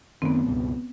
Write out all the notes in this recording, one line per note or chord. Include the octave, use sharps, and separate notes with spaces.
F#2 D#3 A3 B3 C4
C#2 G2 B2